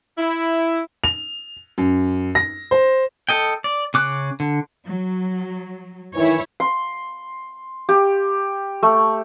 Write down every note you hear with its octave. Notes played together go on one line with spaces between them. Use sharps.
E4
F7
F#2
A#6
C5
A4 D#5 G5
D5
C#3 D6 F#6
D3
F#3
D#3 E3 E4 C#5
C6
G4
A3